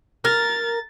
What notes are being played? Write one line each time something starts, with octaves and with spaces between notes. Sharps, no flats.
A#4 A6